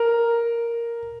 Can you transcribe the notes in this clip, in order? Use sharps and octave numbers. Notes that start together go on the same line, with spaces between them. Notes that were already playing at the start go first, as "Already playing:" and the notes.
Already playing: A#4